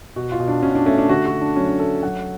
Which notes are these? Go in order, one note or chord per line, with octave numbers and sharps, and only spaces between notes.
B2 F#4
F4
B2
D4
B2 C#4
D4
A3 C#4
D4
D3 F#4
F#4
D3
D4
F#3 C#4
D4
A3 A4
F#3 F#5